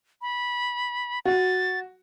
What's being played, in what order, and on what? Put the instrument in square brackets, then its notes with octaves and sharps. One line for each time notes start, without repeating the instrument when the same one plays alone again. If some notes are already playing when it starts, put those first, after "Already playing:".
[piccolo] B5
[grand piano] F#4 [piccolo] A6